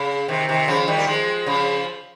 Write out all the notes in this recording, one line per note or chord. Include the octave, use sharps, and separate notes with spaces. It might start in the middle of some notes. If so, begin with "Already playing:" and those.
Already playing: C#3
C3 D#3
C3 D#3
C#3 F3
D#3 G3
A#3
F3 G#3
C#3 F3